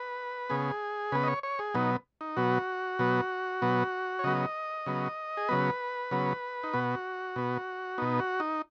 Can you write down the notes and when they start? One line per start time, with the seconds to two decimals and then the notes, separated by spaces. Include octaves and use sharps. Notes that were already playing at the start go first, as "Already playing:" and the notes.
Already playing: B4
0.50 C#3 B3 G#4
1.12 C#3 B3 B4
1.23 D#5
1.28 C#5
1.43 C#5
1.59 G#4
1.74 B2 F#3 B3 D#4
2.21 D#4
2.37 B2 F#3 B3 F#4
2.99 B2 F#3 B3
3.62 B2 F#3 B3
4.19 C#5
4.24 C#3 F#3 B3 D#5
4.86 C#3 F#3 B3
5.37 G#4
5.49 C#3 F#3 B3 B4
6.11 C#3 F#3 B3
6.63 D#4
6.73 B2 B3 F#4
7.36 B2 B3
7.98 B2 B3 D#4
8.19 F#4
8.40 D#4